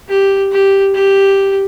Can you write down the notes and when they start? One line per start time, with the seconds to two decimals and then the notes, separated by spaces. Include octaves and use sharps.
0.09 G4
0.52 G4
0.95 G4